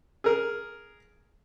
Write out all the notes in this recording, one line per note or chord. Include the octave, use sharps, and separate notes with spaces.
G#4 A#4